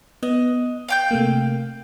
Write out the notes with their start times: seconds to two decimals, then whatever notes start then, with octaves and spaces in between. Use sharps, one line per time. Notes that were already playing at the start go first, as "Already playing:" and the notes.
0.23 B3 D#5
0.89 F5 G5 G6
1.11 C3 A3 A#3